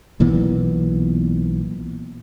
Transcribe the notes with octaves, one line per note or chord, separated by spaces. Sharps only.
B1 A#2 E3 B3